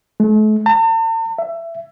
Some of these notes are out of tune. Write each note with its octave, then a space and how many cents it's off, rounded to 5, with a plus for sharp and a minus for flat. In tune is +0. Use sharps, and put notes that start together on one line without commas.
A3 -40
A5 +45
E5 +20